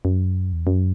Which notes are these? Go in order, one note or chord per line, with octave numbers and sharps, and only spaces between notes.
F#2
E2
F#2